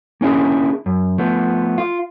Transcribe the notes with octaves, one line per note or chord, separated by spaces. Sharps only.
A#3 C#4 D4 E4 G#4
F#2
F3 A3 B3
F4